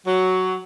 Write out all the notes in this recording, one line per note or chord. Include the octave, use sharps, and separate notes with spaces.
F#3